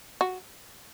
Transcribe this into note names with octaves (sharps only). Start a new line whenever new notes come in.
F#4